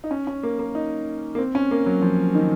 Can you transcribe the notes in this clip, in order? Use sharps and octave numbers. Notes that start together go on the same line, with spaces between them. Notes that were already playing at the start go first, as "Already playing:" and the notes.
D#4
C#4
C#4
A#3
A#3
D#4
A#3
C4
C#4
A#3
F#3
F3
D#3